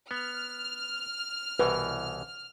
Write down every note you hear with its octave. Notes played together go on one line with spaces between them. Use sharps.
B3 F6
C2 B2 E3 B4